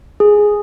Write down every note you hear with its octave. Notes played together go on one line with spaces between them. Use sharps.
G#4